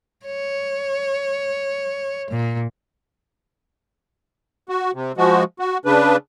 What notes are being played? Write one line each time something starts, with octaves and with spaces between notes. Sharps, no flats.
C#5
A#2
F#4
C3
F3 G#3 F#4
F#4
C#3 D4 B4